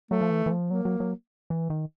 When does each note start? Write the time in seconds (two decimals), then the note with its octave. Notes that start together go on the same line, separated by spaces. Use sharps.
0.11 F#3 A3
0.21 F3
0.31 E3
0.46 E3
0.51 F3
0.70 F#3 A#3
0.85 F#3
1.00 F#3
1.50 E3
1.70 D#3